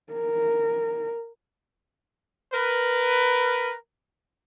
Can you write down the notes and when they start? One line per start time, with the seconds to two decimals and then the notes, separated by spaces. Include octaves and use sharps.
0.13 A#4
2.54 A#4 B4